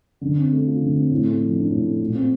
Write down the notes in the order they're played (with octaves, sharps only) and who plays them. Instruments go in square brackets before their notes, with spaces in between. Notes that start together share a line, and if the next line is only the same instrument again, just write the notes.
[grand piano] D3
C4
A3
F4
D3
C4
A2
A3
F3
D4
A2
A3
A#2
C4